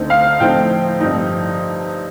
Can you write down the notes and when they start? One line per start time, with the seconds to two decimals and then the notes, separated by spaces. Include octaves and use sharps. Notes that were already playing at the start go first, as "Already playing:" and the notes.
Already playing: D2 D3 A3 C4 D#4
0.10 F5
0.40 A2 F3 A3 C4 D#4 G5
1.00 G2 F3 C4 D#4